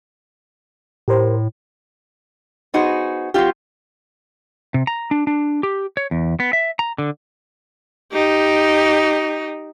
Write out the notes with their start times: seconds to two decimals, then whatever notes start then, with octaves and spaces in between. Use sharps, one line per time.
1.08 A2 G4 A#4 C5
2.74 B3 D#4 F#4 G#4 C5
3.34 F#3 C4 C#4 F4 G4
4.74 C3
4.87 A#5
5.11 D4
5.27 D4
5.63 G4
5.97 C#5
6.11 E2
6.40 B3
6.53 E5
6.79 A#5
6.98 D3
8.13 D#4 G4